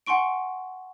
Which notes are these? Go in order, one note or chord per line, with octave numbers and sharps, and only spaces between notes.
F#5 G#5 C6 C#6 D7